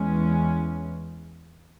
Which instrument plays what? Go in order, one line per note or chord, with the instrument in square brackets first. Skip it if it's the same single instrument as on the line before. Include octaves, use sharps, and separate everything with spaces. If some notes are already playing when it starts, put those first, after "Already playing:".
Already playing: [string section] E2 E3 G#3 C#4